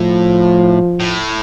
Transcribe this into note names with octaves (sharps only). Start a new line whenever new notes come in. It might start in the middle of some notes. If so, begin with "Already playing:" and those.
Already playing: A2 F3
A2